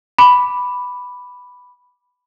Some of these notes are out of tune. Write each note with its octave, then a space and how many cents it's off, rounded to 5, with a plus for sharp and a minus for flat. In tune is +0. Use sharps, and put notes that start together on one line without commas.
B5 +0 D6 +5